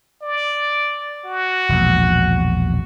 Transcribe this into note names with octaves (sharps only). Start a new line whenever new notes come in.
D5
F#4
E1 A#1